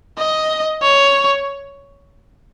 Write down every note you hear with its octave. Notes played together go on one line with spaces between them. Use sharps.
D#5
C#5